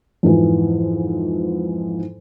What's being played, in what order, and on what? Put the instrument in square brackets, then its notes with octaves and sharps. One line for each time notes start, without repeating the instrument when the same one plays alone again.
[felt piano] F2 G#2 E3 F3